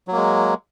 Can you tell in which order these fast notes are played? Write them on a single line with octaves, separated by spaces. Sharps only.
F#3 A#3 G#3